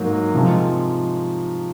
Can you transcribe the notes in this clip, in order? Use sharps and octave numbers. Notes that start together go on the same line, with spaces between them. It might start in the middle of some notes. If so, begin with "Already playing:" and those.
Already playing: G#2 F#3 A#3
C3 F3 G#3